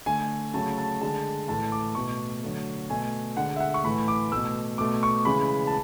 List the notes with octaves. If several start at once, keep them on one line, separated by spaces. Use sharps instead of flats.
D3 A3 G#5
C#3 F#3 A3 A5
A5
D3 G#3 A5
A2 E3 A3 A5
D6
B2 A3 C#6
D3 F#3 A3
B2 A3 G#5
D3 G#3 F#5
E5
F#5
C#6
A2 E3 A3 B5
D6
B2 A3 E6
B2 A3 D6
C#6
C#3 E3 G#3 B5
A5